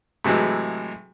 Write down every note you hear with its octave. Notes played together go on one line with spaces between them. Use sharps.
A2 C3 E3 F#3 G#3